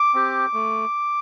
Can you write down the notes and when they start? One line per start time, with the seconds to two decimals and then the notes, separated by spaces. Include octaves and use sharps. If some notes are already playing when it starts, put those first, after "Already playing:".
Already playing: D6
0.14 C4 G4
0.53 A3